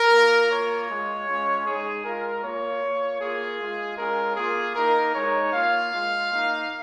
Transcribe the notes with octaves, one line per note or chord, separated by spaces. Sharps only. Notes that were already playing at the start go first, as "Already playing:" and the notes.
Already playing: A#4
A#3 F4
A#3 F4 C#5
G#3 F4
G#3 C#4 F4
G#3 D#4 G#4
G#3 F4 A#4
A#3 F4 C#5
A#3 F4
A#3 F4 G#4
G#3 F4
G#3 C#4 F4 A#4
A#3 F4 G#4
A#3 D#4 A#4
G#3 D#4 C#5
A#3 F4 F5
G#3 F4
A#3 D#4